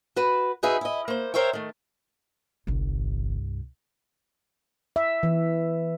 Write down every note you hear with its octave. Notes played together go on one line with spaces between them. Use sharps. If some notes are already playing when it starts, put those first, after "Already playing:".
F#4 B4
D#4 F#4 G#4 B4 E5
E4 D#5
A#3 C5
A#4 C5 C#5 E5 G5
D#3 A3
G1 C2 G2
E5
E3